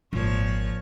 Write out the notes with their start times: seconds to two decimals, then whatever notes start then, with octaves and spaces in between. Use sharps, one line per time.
0.13 G#1 A#2 F3 C#5